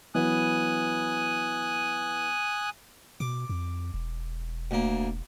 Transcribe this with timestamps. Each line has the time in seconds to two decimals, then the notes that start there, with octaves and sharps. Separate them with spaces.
0.15 E3 F#3 B3 G#5 D#6 F#6
3.20 B2 D6
3.49 F2
3.94 E1
4.71 D2 A#3